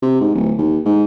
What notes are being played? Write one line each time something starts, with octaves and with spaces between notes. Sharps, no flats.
C3
G#2
D1
D#2
G#2